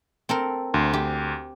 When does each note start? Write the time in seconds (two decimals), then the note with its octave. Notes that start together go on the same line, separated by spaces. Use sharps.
0.29 C4 A4 A#4
0.74 D2 C6
0.93 G4